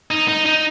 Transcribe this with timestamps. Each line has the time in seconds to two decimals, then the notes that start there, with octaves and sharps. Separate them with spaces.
0.11 D#4
0.28 D#4
0.46 D#4